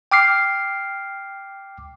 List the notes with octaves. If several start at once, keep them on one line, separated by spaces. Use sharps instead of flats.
G5 D6 F6 C7